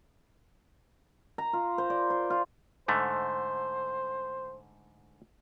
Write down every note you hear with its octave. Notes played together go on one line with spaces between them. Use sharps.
A#5
F4
C5
D5
C5
F4
G#2 D3 A3 C5